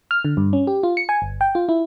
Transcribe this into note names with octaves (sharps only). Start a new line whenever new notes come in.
F6
D3
G2
C#4
G4
F4
C#7
G#5
G1
G5
F4
E4